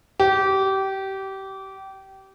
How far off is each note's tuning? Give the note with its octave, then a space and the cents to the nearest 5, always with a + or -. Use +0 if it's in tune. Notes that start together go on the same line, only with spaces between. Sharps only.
G4 -25